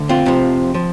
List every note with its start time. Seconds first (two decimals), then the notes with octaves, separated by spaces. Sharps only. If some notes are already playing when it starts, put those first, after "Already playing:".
Already playing: D2 D3
0.09 C4 F4
0.26 F2 C3 F3
0.74 F3